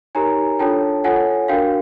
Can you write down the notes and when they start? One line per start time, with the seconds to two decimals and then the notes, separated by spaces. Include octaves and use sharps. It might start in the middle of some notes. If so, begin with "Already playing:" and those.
0.15 D#4 G4 A#4 C#5 G#5 A#5
0.59 D4 F4 A4 C#5 G5 A5
1.04 F4 A4 C#5 F#5 G#5
1.48 D4 F#4 A#4 F5 G5